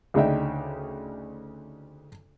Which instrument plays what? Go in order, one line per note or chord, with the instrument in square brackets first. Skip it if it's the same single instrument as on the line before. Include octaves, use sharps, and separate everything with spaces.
[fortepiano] D2 C#3 D4 D#4 E5 G5